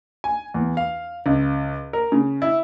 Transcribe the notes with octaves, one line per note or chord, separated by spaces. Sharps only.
G#5
E2
F5
C#2
A#4
C#3
E4